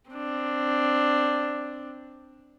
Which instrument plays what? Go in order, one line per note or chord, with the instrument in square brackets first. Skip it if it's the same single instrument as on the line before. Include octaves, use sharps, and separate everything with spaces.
[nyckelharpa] C4 D4